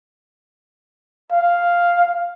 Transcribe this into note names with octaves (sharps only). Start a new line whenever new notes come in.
F5